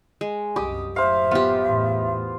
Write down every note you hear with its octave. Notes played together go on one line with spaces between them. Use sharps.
G#3
C2 F#2 G4 D6 D#6
F#1 A2 C5 E5 F5
B3 F4 G4
E2 A2